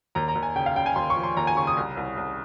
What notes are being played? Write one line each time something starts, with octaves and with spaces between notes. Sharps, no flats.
D#2 A#5
A#5
D#2
G#5
C#3 G5
F5
C#3 G5
G#5
D#2 C6
C#6
F3
C6
D#2 A#5
G#5
C#3 C#6
D#6
C2
C2
C2